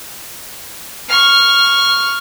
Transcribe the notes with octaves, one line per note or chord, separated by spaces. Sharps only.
C#6 F6